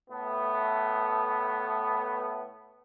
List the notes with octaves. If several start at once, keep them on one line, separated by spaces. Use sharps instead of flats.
A2 A3 B3